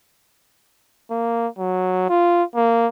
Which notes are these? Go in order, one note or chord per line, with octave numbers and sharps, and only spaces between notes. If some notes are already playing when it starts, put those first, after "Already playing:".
A#3
F#3
F4
A#3